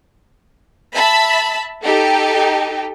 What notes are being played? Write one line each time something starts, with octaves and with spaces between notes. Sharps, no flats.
E5 A5 B5
D#4 G4 A4